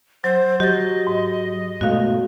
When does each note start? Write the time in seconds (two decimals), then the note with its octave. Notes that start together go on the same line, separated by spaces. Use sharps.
0.24 F#3 C5
0.60 F#3 G4 D#5 A6
1.07 G#2
1.81 G#2 B2 A3 F#4 F5